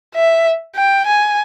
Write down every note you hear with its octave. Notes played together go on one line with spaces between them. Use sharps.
E5
G5
G#5